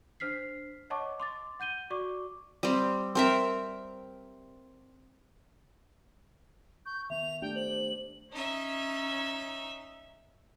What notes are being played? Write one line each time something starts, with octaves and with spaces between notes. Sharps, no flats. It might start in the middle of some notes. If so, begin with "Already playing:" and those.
D4 C5 F6 B6 C7
C#5 D#5 F#5 A5 C#6 D6
C6 D6 A6
F#5 G6 D#7 G7
F#4 D5 C#6 D6
G3 C4
C4 A#4 E5
C#6 G6
D#3 B3 E5 F7
A3 D4 G4 G5
C5 F#7
C#4 D#4 E5